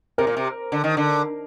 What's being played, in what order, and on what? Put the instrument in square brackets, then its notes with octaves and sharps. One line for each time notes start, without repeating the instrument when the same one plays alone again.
[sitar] C3 [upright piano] A#4
[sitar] A#2
C3
D3
D#3
D3